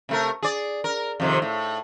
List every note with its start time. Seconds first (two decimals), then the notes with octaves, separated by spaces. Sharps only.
0.09 C3 A3 A#4
0.43 G#4 D5
0.84 A#4
1.20 F2 C3 D#3
1.42 A2